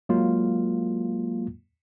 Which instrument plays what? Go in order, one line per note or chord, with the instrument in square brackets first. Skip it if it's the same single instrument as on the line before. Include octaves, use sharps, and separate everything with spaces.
[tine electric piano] F#3 G#3 A#3 F4